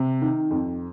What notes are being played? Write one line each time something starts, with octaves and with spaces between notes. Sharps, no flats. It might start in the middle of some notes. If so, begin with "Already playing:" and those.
Already playing: C3
D#3
F2